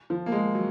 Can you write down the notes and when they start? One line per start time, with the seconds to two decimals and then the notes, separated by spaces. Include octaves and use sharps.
0.10 F3
0.26 A#3
0.32 G#3
0.55 F#3